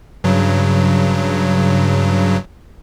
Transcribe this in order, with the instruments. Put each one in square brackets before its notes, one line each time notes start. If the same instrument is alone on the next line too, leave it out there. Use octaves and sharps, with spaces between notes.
[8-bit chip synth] G2 C#3 F#3